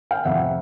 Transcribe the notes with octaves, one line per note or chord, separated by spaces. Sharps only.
F5 G5
F1 F2 C3 F3 E5 F#5